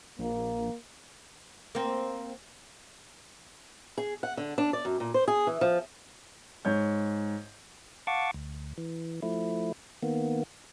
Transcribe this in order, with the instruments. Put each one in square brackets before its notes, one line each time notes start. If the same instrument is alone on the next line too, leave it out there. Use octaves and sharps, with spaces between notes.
[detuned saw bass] A#1 [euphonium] A#3
[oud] A#3 C4
[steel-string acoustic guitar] G#4
F#5
D3
D4
D5
F#2
A#2
C5
G#4
E3
F3
[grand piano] G#2 C#5 G6
[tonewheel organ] F5 F#5 A5 C#6 D6
D2
E3
F3 A3 E4
D#3 A#3 B3